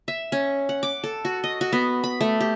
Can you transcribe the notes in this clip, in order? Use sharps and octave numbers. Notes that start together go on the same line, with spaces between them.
E5
C#4
F#5
D6
A4
F#4
D#5
F#4
B3
B5
A3
G4